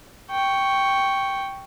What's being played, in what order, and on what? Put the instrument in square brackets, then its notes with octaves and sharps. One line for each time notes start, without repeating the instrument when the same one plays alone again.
[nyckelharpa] G5 C#6